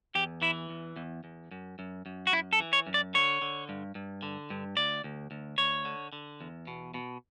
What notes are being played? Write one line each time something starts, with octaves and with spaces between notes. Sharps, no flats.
E2 G4
E3 E4
E2
E2
E2
F#2
F#2
F#2
F#4
F#2 E4
A4
E3
C#5
F#2
D5
D3 C#5
D3
G2
G2
D3
G2
D2 D5
D2
D2
D2 C#5
D3
D3
E2
B2
B2